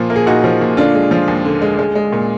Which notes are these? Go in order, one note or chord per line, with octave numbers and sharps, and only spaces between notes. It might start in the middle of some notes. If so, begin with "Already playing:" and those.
Already playing: A#2 F3
A#3
G#4
A#2 D#4 F#4
F3
A#2
D3 D4 F4
G#3
F3
D#2
D3
G#3
G#3
G#3
A#2